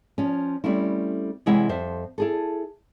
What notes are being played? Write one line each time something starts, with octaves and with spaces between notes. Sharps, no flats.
F3 C#4
G3 A3 C4 C#4 E4
C3 E3 G#3 E4 C#5 F#5
F2 C5 E5
E4 G#4 A4